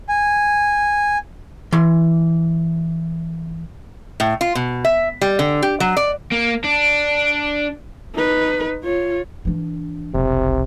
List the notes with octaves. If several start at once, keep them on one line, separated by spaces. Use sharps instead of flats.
G#5
E3 C6
A2
F4
B2
E5
G3
D3
G4
F#3
D5
A#3
D4
D#4 B4
F4 C#5
E3 D4
F1 B1 C3